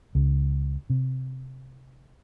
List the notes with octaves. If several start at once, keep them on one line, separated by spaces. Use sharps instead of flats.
C#2
C3